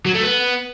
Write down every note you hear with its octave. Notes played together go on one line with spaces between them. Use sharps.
F#3
A3
B3